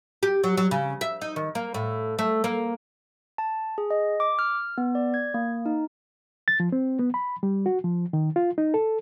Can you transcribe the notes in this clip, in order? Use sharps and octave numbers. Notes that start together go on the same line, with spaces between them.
G4
F#3
F#3
C#3
E5
D#4
D#3
A#3
A2
A3
A#3
A5
G#4
D#5
D6
F6
B3
D5
G#6
A#3
D#4
A6
F3
C4
B3
B5
G3
F#4
F3
D#3
F4
D#4
A4